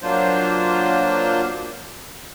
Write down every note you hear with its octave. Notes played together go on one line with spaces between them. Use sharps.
F#3 A#3 D4 F4 C5